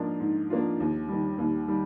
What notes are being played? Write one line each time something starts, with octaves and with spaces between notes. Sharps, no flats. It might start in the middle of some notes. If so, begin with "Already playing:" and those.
Already playing: G#2 F3 A#3 D4 F4
G#2
F3 A#3 D4 F4
D#2
D#3 G3
D#2
D#3 G3